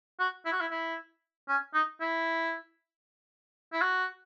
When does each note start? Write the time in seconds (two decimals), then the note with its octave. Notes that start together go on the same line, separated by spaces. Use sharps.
0.19 F#4
0.46 E4
0.52 F#4
0.61 E4
0.71 E4
1.48 C#4
1.74 D#4
2.01 E4
3.73 E4
3.82 F#4